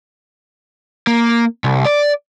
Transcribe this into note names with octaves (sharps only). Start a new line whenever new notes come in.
A#3
C2
D5